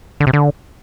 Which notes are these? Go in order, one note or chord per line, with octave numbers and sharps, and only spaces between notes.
D3
C3
D3